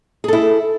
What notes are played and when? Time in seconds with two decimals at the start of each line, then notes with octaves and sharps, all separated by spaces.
0.24 G#4
0.28 A4
0.33 E4